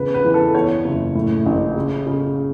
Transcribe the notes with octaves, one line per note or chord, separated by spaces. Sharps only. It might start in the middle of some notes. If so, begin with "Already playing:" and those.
Already playing: E2 C#3 B4
B4
E3
A4
E2 C#5
F#1
A2
A1
C#3
C#3